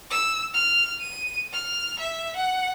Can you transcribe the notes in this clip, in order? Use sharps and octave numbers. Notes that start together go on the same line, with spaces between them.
E6
F6
D#7
F6
E5
F#5